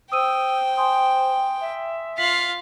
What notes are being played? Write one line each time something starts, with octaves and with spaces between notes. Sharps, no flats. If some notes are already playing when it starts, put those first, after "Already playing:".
C5 G5 D#6 E6 D#7
G#5 C6 D#6
E5
F4 F5 B6 F#7